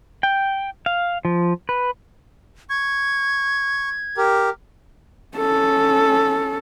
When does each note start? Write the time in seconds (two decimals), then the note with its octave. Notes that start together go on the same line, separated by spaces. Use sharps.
0.23 G5
0.86 F5
1.25 F3
1.69 B4
2.70 C#6 G#6
4.17 G4 A#4
5.37 C#4 A4